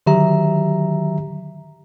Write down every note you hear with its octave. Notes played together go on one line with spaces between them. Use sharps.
D3 D#3 F#3 G4 E5 A#5